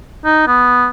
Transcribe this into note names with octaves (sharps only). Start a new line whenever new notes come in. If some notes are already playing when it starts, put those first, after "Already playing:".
D#4
B3